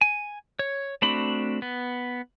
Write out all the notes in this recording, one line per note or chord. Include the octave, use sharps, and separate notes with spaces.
G#5
C#5
A3 C4 D4 F#4 B5
B3